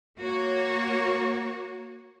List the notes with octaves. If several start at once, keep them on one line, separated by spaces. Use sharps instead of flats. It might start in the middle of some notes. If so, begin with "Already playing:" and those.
A#3 F#4 C#5